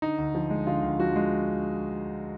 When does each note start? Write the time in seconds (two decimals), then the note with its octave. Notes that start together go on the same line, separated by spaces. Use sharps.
0.02 D3 D#4
0.18 D2
0.35 F3
0.50 G#3
0.67 D3 F4
0.83 D2
1.00 F3 F#4
1.16 G#3